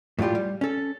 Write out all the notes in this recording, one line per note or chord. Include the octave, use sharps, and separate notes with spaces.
A2 F#3 G3 F4 G4
G3
C#4 A4